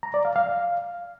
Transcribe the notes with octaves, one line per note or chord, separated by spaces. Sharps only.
A#5
D5
F5
F5